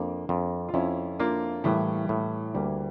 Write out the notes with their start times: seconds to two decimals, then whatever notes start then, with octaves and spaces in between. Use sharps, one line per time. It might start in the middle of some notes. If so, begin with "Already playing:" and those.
Already playing: F2 A#3 D4
0.29 F2
0.69 F4
0.74 F2 C#4 E4
1.19 A#3 D4 F4
1.64 A2 E3 G3
2.09 A2
2.54 D2 G3 A#3